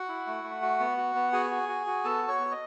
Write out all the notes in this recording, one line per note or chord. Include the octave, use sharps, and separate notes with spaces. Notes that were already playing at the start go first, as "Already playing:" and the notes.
Already playing: F#4 F#5
E4
A3
A3
F#4
B3
F#4
B3
F#4 G#4 G#5
F#4
F#4
F#4
B3 A4 A5
F#4
C#5 C#6
B3
D#5